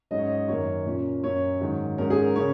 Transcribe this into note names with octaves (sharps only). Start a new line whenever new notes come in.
G#2 F#3 C#4 D#5
C#5
D#5
F#2 D#3 A#3 C#5
A#2 A#3 C#4
F#2 F#3 A#3 C#4 C#5
G#2 D#3 F#3
G#2 F#3 A#3 C#4 A#4
G#4
A#4
C#3 A#3 C#4 C#5